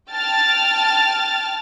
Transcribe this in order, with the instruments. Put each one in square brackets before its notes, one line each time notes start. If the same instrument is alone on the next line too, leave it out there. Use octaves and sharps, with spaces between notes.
[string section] G5 A5 F6 A6